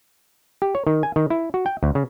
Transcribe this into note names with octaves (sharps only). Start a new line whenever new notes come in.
G4
C#5
D#3
G#5
D#3
E4
F#4
G5
D2
C#3